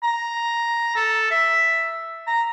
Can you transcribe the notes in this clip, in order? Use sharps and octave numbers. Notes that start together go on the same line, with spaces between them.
A#5
A4
E5
A#5